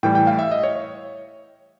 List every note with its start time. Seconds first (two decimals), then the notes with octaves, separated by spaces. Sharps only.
0.03 A2 E3 G3 G5
0.15 G5
0.27 F5
0.39 E5
0.51 D#5
0.64 C#5
0.75 C#5